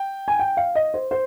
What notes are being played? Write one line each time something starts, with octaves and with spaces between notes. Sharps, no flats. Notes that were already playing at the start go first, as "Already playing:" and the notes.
Already playing: G5
G#5
G5
F5
D#5
C5
C5